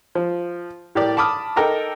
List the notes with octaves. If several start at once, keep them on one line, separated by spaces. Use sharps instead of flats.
F3
A2 G4 A#4 D5
A5 B5 D6 D#6 F6
D#4 A4 A#4 G5 A#5 D6